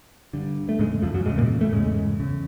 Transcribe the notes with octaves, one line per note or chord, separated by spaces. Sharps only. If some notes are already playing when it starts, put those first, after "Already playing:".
G2 D3
A3
E2 G#2 C#3 G#3
F2 F3
F#2 F#3
E2 G#2 C#3 G#3
A#2 A#3
A2 A3
E2 G#2 C#3 G#3
E2 C#3